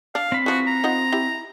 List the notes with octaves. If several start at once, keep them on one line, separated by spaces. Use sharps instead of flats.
D4 F5
C4 B5
E3 F3 F#4
A#5
D#4 F4 F#5
E4 G4